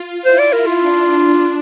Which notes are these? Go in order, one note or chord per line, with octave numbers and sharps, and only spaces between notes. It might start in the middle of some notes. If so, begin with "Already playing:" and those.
Already playing: F4
E4 C5
D5
A#4
F4
D4